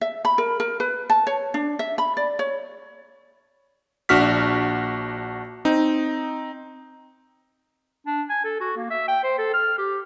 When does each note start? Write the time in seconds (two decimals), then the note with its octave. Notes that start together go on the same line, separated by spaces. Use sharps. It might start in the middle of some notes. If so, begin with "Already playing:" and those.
0.01 E5
0.25 B5
0.38 A#4
0.60 A#4
0.80 B4
1.10 A5
1.27 C#5
1.54 D4
1.79 E5
1.98 B5
2.17 D5
2.39 C#5
4.09 A#1 D4 F#4 F6 B6
5.65 C4 D#4
8.07 D4
8.30 G#5
8.45 A4
8.60 F#4
8.76 A#3
8.90 E5
9.08 G5
9.23 C5
9.38 A4
9.54 F6
9.78 G4